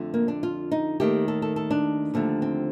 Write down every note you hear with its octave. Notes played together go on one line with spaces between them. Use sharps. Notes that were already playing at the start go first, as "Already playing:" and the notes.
Already playing: F2 D3 A3
A#3
D4
F4
D#4
D#2 D#3 A3 G4
A4
A4
A4
D4
D#2 D3 F3 A3
C4